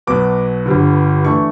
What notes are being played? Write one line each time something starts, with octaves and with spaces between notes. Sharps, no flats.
B1 B2 F#3 B3 D6
G1 G2 D3
E3 A3 D4 C#6